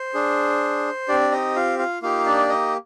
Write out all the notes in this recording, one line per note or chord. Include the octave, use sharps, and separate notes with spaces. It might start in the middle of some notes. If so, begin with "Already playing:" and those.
Already playing: C5
D4 G#4
C4 D4 G4 D5
D#4 D#5
F4 F5
F4 F5
A#3 D#4 F4 G4 F5
D4 D5
D#4 D#5